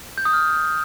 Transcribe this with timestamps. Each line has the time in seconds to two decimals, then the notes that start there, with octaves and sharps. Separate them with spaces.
0.18 G6
0.25 D#6
0.33 F6